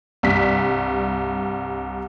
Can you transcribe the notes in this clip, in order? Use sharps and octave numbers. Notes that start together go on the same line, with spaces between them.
C2 G2 B6